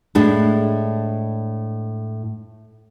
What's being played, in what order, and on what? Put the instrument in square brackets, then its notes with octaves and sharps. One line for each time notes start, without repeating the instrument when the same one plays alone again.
[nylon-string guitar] A2 G#3 D4 E4